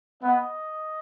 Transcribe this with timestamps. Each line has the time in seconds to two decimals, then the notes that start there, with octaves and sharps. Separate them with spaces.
0.22 B3 D#5